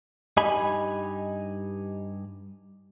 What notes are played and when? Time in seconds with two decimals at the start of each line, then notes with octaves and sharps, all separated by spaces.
0.37 G2 D#4 G4 D#5 G#5 B5